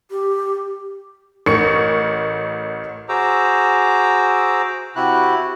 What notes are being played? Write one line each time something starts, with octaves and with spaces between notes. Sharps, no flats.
G4
A1 A#4 C#6 C#7
F#4 G#4 C5 A#5 D6 E6
C3 E4 F#4 G4 F#6